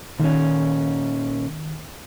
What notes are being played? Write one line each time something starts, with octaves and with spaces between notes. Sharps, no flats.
A#2 D#3 C#4